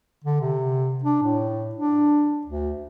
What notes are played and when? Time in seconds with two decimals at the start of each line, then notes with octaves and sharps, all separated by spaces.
0.24 D3
0.41 C3
1.04 D4
1.23 A2
1.75 D4
2.47 D2